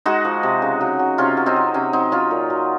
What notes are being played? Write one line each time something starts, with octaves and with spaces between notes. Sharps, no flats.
G#3 D#4 F#4
F3
C3
C#3
F#3
F#3
C3 C#4 F4
F#3
C4 D#4
F#3
C3 C#4
F#3 C4 D#4
F#3 C#4 F4
A#2
F#3